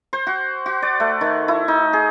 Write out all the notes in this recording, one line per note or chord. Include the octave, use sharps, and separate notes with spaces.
C5
F#4
F#4
D5
A3
D#3
E4
D#4
G#4